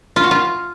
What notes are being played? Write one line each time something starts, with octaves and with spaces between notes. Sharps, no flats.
F4
F#4
F4